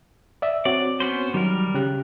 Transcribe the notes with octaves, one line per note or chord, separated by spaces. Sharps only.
D5 E5
C4 F#4 C#5 D5
B3 C#4 C5
D#3 F#3 G3 A#4
C#3 G4 F#6